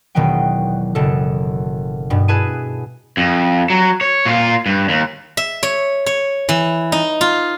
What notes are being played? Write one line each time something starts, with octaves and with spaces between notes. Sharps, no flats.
E1 B2 D#3 F#3 B3 G5
F#1 B2 A4
G2 B2
E4 G#4 B4 G#5 A5 D#7
F2
F#3
C#5
A#2 F4
G2
D#2
E5
C#5
C#5
E3
D#4
F4